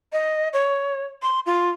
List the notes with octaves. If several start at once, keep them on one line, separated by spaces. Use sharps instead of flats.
D#5
C#5
C6
F4